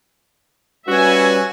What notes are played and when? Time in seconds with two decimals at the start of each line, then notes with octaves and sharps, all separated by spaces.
0.88 G3 C#4 F#4 B4 E5 G#5